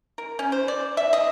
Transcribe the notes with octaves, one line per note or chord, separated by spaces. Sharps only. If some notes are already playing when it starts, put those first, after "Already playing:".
A#4
C#4
C5
D5
E5
D#5